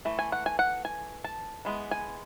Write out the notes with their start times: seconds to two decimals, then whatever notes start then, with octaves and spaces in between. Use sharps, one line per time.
0.05 E3 A3
0.19 G#5
0.32 F#5
0.46 G#5
0.59 F#5
0.85 G#5
1.24 A5
1.65 E3 G#3 B3
1.91 G#5